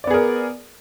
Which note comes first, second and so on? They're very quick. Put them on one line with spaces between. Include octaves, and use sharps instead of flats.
D5 B3 G#4 A#4